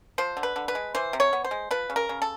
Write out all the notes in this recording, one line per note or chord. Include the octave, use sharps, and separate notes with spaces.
F3 C5
D3
B4
D3
B4
G#3
E3 C5
C3
C#5
B3
C5
G#3
F3 B4
C#3
A#4
C#3
A4